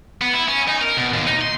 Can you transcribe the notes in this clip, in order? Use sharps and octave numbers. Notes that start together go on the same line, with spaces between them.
B3
E4
C#4
D#4
A#4
B2
D#2
D#4
C6